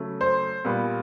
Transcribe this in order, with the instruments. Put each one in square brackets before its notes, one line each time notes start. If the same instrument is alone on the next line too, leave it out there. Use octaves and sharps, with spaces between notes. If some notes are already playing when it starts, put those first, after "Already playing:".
Already playing: [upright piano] C#3 F#3 A3
C5
A#2 G3 B3